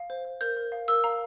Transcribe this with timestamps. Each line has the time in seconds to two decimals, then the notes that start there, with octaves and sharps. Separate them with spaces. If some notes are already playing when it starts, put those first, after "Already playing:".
Already playing: F5
0.10 C5
0.25 C5
0.41 A#4 G6
0.57 A#4
0.72 F5
0.88 A#4 E6
1.04 F5 A#5